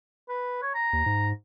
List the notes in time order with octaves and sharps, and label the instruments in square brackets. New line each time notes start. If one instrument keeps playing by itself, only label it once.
[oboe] B4
C#5
A#5
[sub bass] D#2
G#2